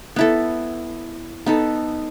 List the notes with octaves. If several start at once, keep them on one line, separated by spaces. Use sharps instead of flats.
B3 E4 A4
B3 D#4 A4